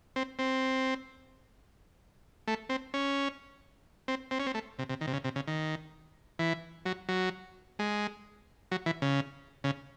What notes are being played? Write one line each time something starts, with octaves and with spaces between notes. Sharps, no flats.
C4
C4
A3
C4
C#4
C4
C4
C#4
C4
A3
C3
C3
D#3
C3
C#3
C3
C#3
D#3
E3
F#3
F#3
G#3
F#3
E3
C#3
C#3